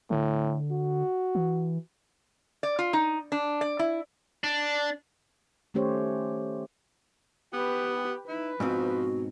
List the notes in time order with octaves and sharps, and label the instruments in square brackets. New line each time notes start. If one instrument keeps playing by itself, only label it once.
[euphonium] A2 [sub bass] D3
[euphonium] F#4
[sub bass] E3
[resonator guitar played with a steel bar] D5
F4
D#4
D4
D5
E4
[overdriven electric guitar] D4
[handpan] D#3 A3 C#4 G4 C5 C#5
[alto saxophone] B3 [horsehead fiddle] G4 B4
[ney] D#4 [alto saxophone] E4 [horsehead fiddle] B4
[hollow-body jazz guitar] G#2 B2 C4 [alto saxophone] F3 [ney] F#4